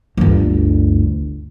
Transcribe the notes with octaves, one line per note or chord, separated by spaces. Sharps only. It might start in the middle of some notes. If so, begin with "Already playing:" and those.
G1 D2